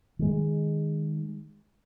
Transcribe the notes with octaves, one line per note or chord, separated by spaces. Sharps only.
D#3 G#3